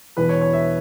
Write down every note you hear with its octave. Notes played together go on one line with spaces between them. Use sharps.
E1 E2 E3 B4
C#5
C#5
E5